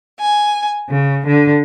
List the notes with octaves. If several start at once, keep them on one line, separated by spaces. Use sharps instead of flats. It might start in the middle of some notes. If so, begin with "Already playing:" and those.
G#5
C#3
D3